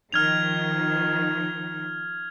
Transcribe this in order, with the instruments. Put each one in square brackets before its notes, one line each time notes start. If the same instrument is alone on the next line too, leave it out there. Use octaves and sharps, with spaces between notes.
[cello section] D#3 F3 [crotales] F6 G#6 F7